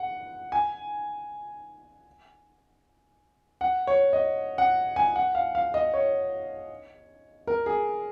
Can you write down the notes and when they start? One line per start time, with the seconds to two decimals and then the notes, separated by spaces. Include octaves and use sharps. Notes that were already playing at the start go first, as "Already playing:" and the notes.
Already playing: F#5
0.52 G#5
3.61 F#5
3.87 C#5
4.13 D#5
4.58 F#5
4.96 G#5
5.16 F#5
5.35 F5
5.55 F5
5.74 D#5
5.94 C#5
7.47 A#4
7.66 G#4